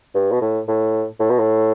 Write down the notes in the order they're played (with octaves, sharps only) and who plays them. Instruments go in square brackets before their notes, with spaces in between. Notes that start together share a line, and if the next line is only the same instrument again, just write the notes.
[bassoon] G2
B2
A2
A2
A2
B2
A2